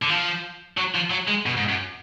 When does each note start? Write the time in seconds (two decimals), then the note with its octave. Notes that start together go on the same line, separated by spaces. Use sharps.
0.02 D3
0.09 F3
0.78 F#3
0.95 F3
1.11 F#3
1.28 G#3
1.46 B2
1.57 G#2
1.69 F#2